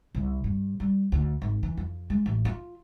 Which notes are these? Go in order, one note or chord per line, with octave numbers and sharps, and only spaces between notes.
C2
G2
G3
D2
G#1
E3
F2
G#3
A1
F4